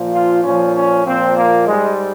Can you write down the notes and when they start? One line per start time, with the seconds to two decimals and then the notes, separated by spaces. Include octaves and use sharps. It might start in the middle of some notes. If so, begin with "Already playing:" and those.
Already playing: A#2 F3
0.13 F4
0.43 A#2 F3 C#4
0.74 C#4
1.05 A#2 F3 C4
1.37 A#3
1.67 G#2 G3 G#3